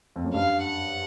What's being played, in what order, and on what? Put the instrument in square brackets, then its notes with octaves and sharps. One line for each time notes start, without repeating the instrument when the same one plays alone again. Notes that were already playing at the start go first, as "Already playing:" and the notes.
[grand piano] F2
F#2
[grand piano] G2 [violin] F5
[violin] F#5